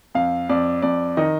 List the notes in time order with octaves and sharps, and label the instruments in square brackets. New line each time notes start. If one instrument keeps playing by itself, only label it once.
[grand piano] F2 F5
F2 D5
F2 D5
D#3 D#5